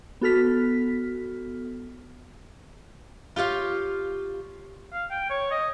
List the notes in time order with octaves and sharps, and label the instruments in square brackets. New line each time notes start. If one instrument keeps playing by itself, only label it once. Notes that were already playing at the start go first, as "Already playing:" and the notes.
[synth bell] B3 F#4 A4 F6 B6
[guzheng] F4 G4 C#5 F5
[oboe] F5
G5
C#5
D#5